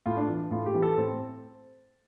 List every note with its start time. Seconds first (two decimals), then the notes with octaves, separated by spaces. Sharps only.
0.06 A2 F4
0.17 D4
0.28 E3
0.51 A2 F4
0.66 G4
0.74 E3
0.82 A4
0.97 A2 C4